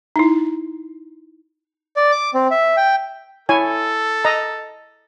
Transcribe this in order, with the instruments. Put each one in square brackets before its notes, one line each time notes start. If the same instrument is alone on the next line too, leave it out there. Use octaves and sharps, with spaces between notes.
[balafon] D#4 E4
[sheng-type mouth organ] D5
D6
C4
E5
G5
[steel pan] E4 C#5 G#5 [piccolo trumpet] A4
[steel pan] D#5 A#5